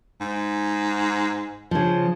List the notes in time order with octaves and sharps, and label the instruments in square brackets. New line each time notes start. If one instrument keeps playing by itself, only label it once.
[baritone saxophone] G#2
[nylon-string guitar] C#3 F3